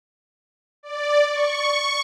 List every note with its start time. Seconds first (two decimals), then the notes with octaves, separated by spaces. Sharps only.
0.83 D5
1.30 C#6